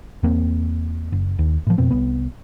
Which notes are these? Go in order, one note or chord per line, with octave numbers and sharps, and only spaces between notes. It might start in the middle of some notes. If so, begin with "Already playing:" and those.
E2 A#3 C4
F#1
D#2
A2 F3
F2 B2 C4
C2 B3